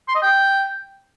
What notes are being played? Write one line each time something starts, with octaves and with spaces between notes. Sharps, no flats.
C6
D#5
G5